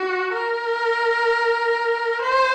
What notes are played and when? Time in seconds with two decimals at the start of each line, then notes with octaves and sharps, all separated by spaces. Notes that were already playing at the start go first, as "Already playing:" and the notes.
Already playing: F#4
0.33 A#4
2.22 C5